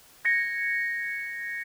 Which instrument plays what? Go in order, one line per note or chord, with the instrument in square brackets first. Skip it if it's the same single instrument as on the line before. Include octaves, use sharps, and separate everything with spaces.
[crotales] G#6 A#6 C#7